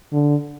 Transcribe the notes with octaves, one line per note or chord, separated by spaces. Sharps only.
D3